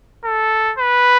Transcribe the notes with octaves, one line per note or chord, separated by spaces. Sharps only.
A4
B4